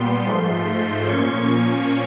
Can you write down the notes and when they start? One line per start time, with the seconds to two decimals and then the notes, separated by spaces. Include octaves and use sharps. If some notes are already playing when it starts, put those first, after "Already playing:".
Already playing: A#2 G3 B3 C6
0.25 G#2 F3 A3
1.06 A#2 F3 A#3 C#4 C#6